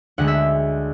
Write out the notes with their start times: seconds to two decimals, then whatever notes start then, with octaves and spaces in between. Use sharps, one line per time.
0.18 D2 D3 G#3 F#5
0.28 E5